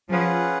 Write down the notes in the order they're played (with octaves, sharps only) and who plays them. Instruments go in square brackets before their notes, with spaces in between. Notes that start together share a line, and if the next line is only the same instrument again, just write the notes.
[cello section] F3 [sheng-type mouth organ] C#4 F4 G#4 B4 F#5